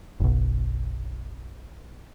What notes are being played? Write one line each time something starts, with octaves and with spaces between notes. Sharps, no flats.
F#1 B1